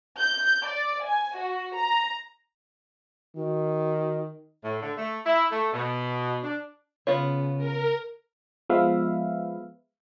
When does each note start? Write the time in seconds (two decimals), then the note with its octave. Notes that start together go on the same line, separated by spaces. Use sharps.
0.19 G6
0.66 D5
1.06 G#5
1.38 F#4
1.76 A#5
3.36 D#3 F#4
4.64 A2
4.81 D3
4.97 A3
5.26 E4
5.51 A3
5.73 B2
6.43 D4
7.07 C#3 B3 F4 C#5
7.57 A#4
8.70 F3 G#3 B3 B4 E5 F5